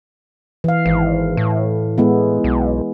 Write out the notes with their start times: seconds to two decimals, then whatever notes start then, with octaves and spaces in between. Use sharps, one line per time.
0.64 E3 F5
0.86 G#1 E3
1.37 A2
1.98 G#3 B3 E4
2.44 B1